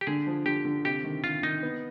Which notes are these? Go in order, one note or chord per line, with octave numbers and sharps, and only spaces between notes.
G4
D3 G#4
F3
D3 G4
D3
C3 G4
D#3
D#3 F4
D#3 D#4
B3